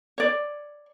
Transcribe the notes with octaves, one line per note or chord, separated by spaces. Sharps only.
C#5 D5